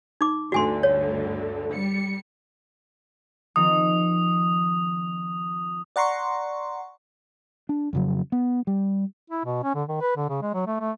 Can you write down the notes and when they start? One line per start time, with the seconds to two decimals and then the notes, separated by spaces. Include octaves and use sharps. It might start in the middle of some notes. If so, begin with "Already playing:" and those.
0.21 D#4 D6
0.52 G1 D2 D3 F#4 G#5 C6
0.83 C#5
1.73 G3 C#7
3.56 D#3 F3 C4 D#6
5.96 D5 F#5 A#5 C6 C#6
7.69 D4
7.93 F2 C#3 F#3
8.32 B3
8.67 G3
9.30 E4
9.45 B2
9.63 C#4
9.75 D3
9.88 D#3
10.01 B4
10.16 D3
10.29 C#3
10.42 G#3
10.54 F#3
10.66 A3
10.80 A3